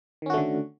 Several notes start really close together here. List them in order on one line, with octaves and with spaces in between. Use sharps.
D#3 C#4 F#4 A3 D3